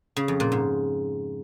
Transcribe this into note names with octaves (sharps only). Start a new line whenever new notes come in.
C#3
F2
A#2
G#2